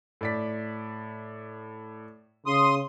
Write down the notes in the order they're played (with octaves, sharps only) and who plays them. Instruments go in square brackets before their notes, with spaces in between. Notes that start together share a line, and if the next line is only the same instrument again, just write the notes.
[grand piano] A2 D5 B6
[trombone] C#3 [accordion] C6 D#6